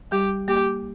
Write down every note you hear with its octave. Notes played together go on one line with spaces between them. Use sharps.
G3 G4
A#3 G4